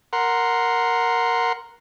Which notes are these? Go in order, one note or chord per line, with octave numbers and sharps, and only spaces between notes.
A#4 F#5 C6